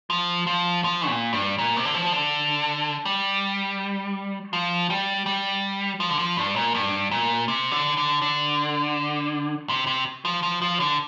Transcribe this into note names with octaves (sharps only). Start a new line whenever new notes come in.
F3
F3
F3
A#2
G2
A#2
C3
D3
F3
D3
G3
F3
G3
G3
F3
D3
F3
G2
A#2
G2
A#2
C3
D3
D3
D3
C3
C3
F3
F3
F3
D3